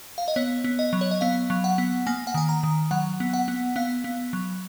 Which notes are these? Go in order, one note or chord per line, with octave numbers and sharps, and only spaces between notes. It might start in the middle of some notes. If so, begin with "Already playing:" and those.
F5
D#5
B3 C#5
B3
D#5
F#3
C#5
D#5
B3 F5
F#3
F#5
B3
A#3 G#5
F#5
D#3 G#5
A#5
D#3
F#3 F#5
B3
F#5
B3
B3 F5
B3
F#3